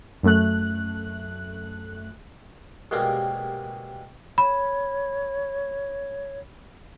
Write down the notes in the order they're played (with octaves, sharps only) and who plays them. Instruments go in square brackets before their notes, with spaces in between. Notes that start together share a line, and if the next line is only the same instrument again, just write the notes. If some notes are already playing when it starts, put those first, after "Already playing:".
[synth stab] F#2 A3 F#6
[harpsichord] D#2 B2 G3 G#3 A#3 C4
[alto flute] C#5 [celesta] B5